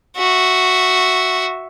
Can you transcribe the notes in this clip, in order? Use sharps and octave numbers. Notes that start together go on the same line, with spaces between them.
F#4 E5